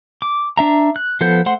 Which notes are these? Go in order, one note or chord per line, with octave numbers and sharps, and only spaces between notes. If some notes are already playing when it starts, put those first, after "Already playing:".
D6
D4 E5 A#5
F#6
F3 B3 A4 C5 G6
A3 C5 F#5 C6